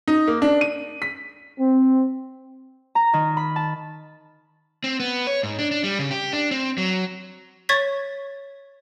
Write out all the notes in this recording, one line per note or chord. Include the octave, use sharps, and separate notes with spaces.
D#4
A#3
D4
D#7
B6
C4
A#5
D#3
B5
A5
C4
B3
C#5
G#2
D4
D4
G3
C#3
G4
D4
C4
F#3
C#5 C#6 G#6 A6 B6